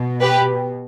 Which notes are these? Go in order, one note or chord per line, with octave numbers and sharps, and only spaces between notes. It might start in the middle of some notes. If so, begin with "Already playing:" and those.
Already playing: B2
G4 B4